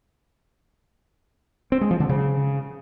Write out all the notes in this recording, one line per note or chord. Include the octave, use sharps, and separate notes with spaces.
C4
G#3
F3
D3
C#3